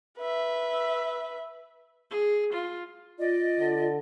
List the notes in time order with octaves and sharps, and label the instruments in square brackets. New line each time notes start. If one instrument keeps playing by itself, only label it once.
[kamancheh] B4 E5
[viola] G#4
F4
[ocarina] F4 [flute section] D5 D#5
[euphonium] D3